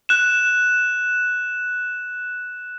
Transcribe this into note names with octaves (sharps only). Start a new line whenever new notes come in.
F#6 E7